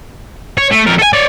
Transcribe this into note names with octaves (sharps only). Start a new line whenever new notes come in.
C#5
A3
F2 A#4
A4 G#5
C#5 D5